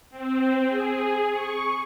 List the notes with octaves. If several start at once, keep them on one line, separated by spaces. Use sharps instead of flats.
C4
G#4
C#6